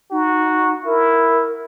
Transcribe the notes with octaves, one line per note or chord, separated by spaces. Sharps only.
D#4 F#4
E4 A#4